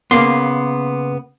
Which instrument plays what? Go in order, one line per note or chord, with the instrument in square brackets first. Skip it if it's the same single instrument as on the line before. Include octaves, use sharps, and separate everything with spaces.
[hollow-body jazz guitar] C#3 A#3 B3 [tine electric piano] C6 D6 C7